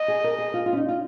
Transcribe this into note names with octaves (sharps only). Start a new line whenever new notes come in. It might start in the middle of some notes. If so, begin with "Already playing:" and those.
Already playing: D#5
G#4
A#4
G#4
F4
F4
C#4
D#4
F4